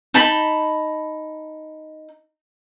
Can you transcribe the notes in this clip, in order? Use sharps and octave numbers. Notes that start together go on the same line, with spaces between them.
D#4 A5 B5